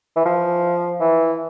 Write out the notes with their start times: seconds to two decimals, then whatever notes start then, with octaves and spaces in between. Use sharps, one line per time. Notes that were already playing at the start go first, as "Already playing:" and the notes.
0.16 E3
0.25 F3
1.00 E3